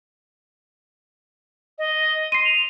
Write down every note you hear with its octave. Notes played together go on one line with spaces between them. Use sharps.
D#5
C6 C7 D#7
F7